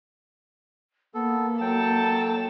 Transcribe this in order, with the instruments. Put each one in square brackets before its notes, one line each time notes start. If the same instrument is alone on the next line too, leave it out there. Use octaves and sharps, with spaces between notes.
[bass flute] A#3 [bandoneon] B3 A4
[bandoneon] F#3 G5 [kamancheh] A4 A5